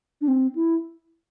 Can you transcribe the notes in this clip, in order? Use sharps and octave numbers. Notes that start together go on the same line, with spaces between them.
D4
C4
E4